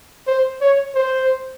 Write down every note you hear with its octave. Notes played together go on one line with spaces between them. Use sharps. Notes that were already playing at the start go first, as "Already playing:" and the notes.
C5
C#5
C5